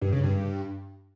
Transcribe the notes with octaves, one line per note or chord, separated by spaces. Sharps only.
G2
C#3
G2